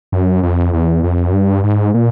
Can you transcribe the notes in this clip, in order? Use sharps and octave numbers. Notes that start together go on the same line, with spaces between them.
F#2
F2
E2
F2
F#2
G2
G#2
A#2